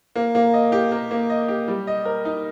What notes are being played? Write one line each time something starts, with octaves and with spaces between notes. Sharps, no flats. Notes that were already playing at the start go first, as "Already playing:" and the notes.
A#3
A#3
D#5
G4
A#3
A#3
D#5
G4
G3
D#5
A#4
D#4